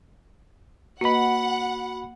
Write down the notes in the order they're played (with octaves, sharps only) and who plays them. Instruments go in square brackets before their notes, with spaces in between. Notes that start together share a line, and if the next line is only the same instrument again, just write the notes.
[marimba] A#3 B4 D#5 [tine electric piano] F#4 B5 [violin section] F#5